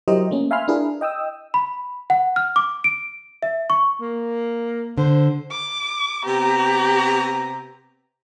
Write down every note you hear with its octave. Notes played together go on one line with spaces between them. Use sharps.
F#3 E4 G4 A#4 C5 D#5
A3 A#3 C#4
E5 F5 G#5 B5 C6 F6
D4 E4 G#4 A#4 B4
D#5 G5 D#6 E6
B5
F#5
F6
D6
D7
E5
C#6
A#3
D3 C5
D6
C3 B3 G4 A#5